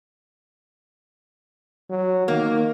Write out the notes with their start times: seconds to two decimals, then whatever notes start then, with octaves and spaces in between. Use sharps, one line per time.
1.90 F#3
2.28 D#3 A#3